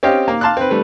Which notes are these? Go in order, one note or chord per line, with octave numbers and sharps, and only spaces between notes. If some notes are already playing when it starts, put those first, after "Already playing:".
C4 C#4 G4 D#5 F5 G5
A#3
F5 A5 C6 D6 F#6
C4 B4
G3 A3 B4